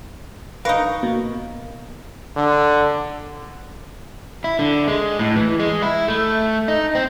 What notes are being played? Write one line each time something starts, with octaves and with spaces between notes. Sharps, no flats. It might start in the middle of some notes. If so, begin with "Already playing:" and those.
D#4 A#4 B4 F5 C#6
B2 A#3
D3
E4
D3
G#3
A2
E3
G#3
E4
A3
D#4
C4